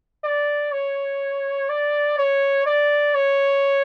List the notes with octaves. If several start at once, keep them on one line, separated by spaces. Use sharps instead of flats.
D5
C#5
D5
C#5
D5
C#5